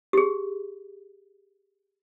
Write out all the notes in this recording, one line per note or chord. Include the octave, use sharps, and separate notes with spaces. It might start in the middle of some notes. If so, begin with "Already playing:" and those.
G4 G#4